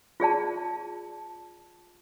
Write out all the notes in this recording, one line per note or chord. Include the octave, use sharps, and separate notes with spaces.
F4 G#4 D5 A5